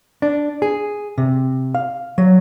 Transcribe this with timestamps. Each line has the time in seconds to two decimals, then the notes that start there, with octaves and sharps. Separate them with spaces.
0.22 D4
0.62 G#4
1.18 C3
1.75 F5
2.18 F#3